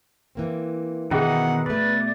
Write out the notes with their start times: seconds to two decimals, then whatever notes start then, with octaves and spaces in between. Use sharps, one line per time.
0.35 E3 A#3 C4
1.11 B2 D#3 E3 C#4 D#4 G#4 F#5
1.66 B2 A3 B4 D5